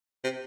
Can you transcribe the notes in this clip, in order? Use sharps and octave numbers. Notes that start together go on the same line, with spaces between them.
C3